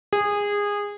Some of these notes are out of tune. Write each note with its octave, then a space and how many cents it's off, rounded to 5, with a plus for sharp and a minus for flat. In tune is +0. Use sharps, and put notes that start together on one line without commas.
G#4 -20